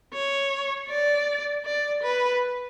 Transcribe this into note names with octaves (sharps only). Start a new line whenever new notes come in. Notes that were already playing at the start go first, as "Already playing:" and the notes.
C#5
D5
D5
B4